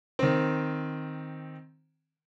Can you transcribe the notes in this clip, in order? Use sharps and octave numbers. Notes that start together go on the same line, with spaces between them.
D#3 C4